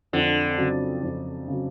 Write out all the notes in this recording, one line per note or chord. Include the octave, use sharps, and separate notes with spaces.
F2 D3
C#3 F#3
F2
C#3 F#3